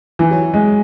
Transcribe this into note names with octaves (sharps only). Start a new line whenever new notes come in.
E3
F#3
G#3